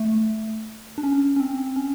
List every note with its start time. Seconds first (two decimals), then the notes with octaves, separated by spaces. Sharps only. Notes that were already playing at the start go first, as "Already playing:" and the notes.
Already playing: A3
0.98 D4
1.03 C#4
1.36 C#4
1.40 C4
1.76 C#4